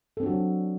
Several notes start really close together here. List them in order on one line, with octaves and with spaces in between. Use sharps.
A4 C4 D4 F#4 F#3